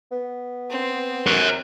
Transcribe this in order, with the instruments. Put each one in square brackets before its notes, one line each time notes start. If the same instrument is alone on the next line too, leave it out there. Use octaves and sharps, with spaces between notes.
[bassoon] B3
[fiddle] C4
[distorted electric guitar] A#4 C#5